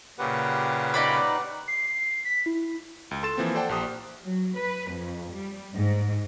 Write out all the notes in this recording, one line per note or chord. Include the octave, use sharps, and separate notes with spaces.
A#2 C#3 G4 B4 F#5
D#4 D5 B5
C7
B6
E4
C#2
A4 C6 A6 E7
E3 F3 A#3 C4
A4 C5 D5 F#5 G5 A5
A#1 G4 C5 D#6
F#3
B4
F2
G3
G#2